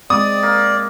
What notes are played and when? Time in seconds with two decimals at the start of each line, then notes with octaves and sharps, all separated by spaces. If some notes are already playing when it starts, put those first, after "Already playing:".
0.10 G#3 C4 D5 D#6
0.43 A#3